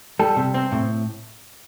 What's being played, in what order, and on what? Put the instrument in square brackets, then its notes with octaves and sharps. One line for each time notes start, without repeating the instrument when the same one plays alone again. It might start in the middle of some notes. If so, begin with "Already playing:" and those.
[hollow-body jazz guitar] G3 A4
C3
C4
A2